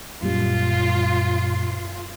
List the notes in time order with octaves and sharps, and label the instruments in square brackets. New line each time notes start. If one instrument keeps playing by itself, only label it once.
[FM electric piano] F#2 A#2 G3 [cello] F4